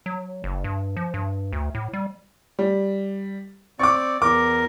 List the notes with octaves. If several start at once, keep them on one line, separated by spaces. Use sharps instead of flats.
F#3
F#1
G2
F3
G2
D2
A2
G3
G3
C4 D5 C#6 D6
E2 A#4 D6